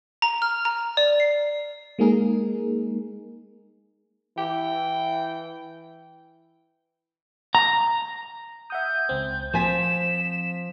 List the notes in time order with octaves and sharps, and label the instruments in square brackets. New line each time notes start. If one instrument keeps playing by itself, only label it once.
[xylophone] A#5
F6
A#5
D5
C7
[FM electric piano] G#3 A#3 D#4 G#4 A#4
[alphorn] E3 [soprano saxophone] G5
[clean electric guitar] A#5
[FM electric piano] E5 F#5 D#6 [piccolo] G6
[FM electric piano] C#2 C4
[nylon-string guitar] F3 G#5 [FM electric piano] C4 B6 [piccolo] E7